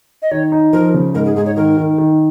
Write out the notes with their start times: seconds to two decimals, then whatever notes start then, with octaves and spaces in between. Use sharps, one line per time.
0.22 D#5
0.31 D#3 C#5
0.52 D#4
0.73 F3 A#4
0.94 C#3
1.14 G#2 A#4
1.25 G#4
1.36 G#2 G#4
1.46 C#5
1.56 D#3 A#4
1.77 D#3
1.98 D#3